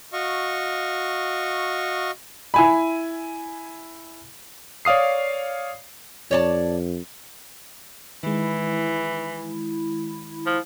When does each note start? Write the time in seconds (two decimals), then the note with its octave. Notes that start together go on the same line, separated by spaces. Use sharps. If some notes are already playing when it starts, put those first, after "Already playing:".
0.13 F#4 D#5 F5 C#6
2.54 E4 G#5 B5
4.85 C#5 D5 F5 D#6 C7
6.31 F2 C#5 D5 A5
8.23 D#3 E3 G#3 E4
10.46 F3